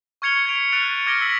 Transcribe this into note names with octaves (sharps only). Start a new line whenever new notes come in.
C#6 F6 G#6 C#7 F7 G7
G#6 B6 C7 D7 F7
F6 F#6 A6 D7 D#7 F7
A6
D6 F6 G#6 A#6 D7 G7
E6 B6 F#7 G7